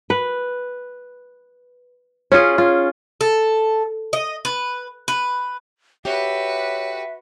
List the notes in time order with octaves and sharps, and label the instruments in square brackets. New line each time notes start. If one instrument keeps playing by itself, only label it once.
[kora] B4
C#4 F4 G#4
F4
[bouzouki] A4
D#5
B4
B4
[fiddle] F#4 B4 [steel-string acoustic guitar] G4 A4 [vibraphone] C#5 [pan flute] E5